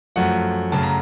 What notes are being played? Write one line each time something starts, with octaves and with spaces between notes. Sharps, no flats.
F#2 F3 A3 F#5
F#2 C#3 F#3 A3 A5
A#5